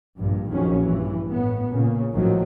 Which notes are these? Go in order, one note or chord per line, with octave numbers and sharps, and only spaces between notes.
A#1 G2
A#1 F2 D#3 F#3 C#4
G2 E3
A2 B3
A#2 C#3
A1 G#2 D#3 F3 F#3 A3